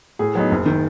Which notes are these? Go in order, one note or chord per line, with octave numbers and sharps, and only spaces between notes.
A2 G#4
F#3 B3 D#4
F#1
D#3